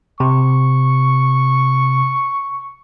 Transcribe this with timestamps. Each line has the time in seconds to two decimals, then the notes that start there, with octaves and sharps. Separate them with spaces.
0.20 C3 C#6